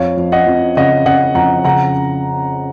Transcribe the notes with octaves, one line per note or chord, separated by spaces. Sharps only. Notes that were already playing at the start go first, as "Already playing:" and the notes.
Already playing: F2 C#5 F5
F2
D#5 F#5
F2
C#3 D#5 F#5
C#3 D#5 F#5
F2 F#5 A#5
C#3 F#5 A#5